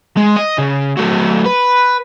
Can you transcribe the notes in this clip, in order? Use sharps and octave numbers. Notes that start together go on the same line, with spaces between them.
G#3
D#5
C#3
F#3 A3
B4